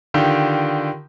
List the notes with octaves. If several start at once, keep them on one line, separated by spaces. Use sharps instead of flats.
D3 D#3 F4 G4